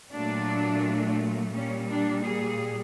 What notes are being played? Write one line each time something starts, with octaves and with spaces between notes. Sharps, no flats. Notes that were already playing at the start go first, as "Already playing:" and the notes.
A#2 F#3 A3 D4
A#2 G3 C#4
D4
G#4